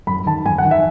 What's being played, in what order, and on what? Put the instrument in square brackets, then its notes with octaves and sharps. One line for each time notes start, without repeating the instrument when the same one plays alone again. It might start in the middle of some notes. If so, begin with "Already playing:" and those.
[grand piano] F#2 B5
D#3 A5
F#2 G#5
F#5
D#3
E5